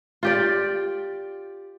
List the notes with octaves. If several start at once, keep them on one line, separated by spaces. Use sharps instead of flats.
F4 G4 D5